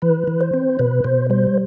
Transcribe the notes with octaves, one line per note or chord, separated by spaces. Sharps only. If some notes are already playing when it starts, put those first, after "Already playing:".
E3 B4
E3
C5
C4
B2 B4
B2 C5
G3 C5